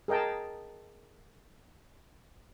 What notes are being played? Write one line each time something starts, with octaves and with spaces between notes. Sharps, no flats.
G#4 A#4 D#5 G5 A5